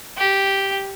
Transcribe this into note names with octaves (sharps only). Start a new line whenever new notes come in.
G4